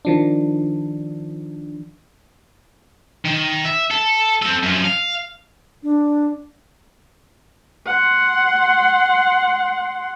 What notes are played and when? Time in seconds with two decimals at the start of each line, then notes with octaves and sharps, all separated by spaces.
0.05 D#3 F3 D4
3.25 D#3
3.65 E5
3.91 A4
4.42 C4 A4
4.63 F#2 F3
4.84 F5
5.83 D4
7.86 F#5 C6